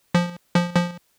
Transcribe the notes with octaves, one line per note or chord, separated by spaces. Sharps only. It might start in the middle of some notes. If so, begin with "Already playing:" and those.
F3
F3
F3